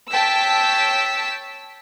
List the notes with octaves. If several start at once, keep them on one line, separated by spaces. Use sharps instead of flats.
C#5 G5 A5 E6 B6